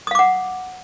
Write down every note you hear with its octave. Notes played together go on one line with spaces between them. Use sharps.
F5 F#5 D6 D#6